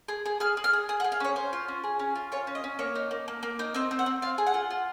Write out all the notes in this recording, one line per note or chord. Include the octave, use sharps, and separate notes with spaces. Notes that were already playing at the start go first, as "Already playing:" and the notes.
G#4
G#4
G#4 F6
G#4
F6
G#4
G#4 D#6
F#5
G#4
F5
C#4 C#5
C#4 C5
F4
C#4
G#4
C#4
F4
F4 C#5
C#4
D#5
C#4
A#3 C#5
D#4
A#3
A#3
A#3
D#4
C4 D#5
C4
F#5
C4
F4 F5
G#4
F#5
F4
F4